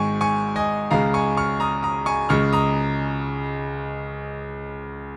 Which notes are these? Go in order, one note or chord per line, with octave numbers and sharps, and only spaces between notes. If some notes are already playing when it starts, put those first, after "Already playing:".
Already playing: G#1 G#2 G#3 G#5 C#6
G#5 C#6
D#5 G#5
C#2 C#3 G#3 F5 A#5
G#5 C#6
C#6 F6
A#5 D#6
A#5 D#6
G#5 C#6
C#2 C#3 G#3 C#6 F6
A#5 D#6